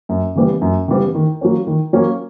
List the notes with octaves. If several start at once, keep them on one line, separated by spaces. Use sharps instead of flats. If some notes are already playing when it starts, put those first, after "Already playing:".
F#2
C#3 E3 G3 B3
F#2
C#3 E3 G3 B3
D#3
F#3 A#3 C#4
D#3
F#3 A#3 C#4